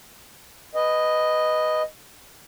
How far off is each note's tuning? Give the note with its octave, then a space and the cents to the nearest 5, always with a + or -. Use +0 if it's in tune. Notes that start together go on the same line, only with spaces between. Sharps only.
B4 +0 D#5 +0 G#5 -40